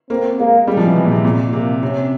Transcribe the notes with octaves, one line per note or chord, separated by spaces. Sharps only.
A#3 C4
G#3 A#3
G3 G#3
F3
E3
C3
A#2
C3
A#2 G#3
C3 A#3
C3 C#4